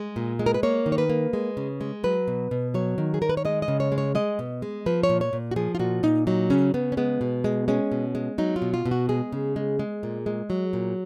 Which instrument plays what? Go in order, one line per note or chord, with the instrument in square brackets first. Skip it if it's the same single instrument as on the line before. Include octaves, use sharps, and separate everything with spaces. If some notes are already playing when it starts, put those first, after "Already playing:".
Already playing: [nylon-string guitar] G#3
A#2
G#3
A#4
B4
A#3 C#5
D#3
C#5
B4
A#3
G#3
C#3
G#3
F#3 B4
B2
B2
F#3 C#5
D#3
G#4
D#3 A#4
B4
C#5
G#3 D#5
D#5
C#3
C#5
G#3
C#5
G#3 D#5
B2
G#3
F3 B4
C#5
A#2
C#5
A#2
F#4
F3 G#4
F4
A#2 F#4
A#2 D#4
F#3 D#4
C#3 C#4
C#3 B3
C#4
G#3 B3
B2
G#3
G#3 C#4
B2
G#3
F#3 D#4
F4
B2
F4
B2
F#4
G#3 G#4
C#3
G#3
G#3
A#2
G#3
F#3
A#2